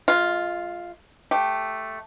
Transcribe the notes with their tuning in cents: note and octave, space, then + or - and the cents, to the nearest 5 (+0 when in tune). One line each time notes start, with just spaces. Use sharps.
G#3 +40 F4 +0
A3 +0 G4 +0